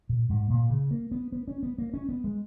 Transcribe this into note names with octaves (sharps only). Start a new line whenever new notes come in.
A#2
G#2
A#2
C#3
A#3
B3
B3
C#4
B3
A#3
C#4
B3
G#3